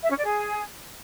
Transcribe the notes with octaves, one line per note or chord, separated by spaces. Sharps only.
E5
C#4
D5
G#4